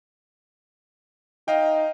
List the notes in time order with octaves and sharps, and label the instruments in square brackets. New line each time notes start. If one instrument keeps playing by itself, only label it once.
[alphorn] D#4 [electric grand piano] D#5 F5 G5